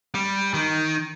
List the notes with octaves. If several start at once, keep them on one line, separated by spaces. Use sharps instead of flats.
G3
D#3